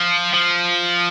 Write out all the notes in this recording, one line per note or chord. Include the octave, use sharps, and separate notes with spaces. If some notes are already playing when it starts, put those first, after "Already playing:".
Already playing: F3
F3